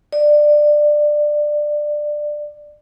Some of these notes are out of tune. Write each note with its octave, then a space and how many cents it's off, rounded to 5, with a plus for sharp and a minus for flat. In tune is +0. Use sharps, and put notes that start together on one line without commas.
D5 +15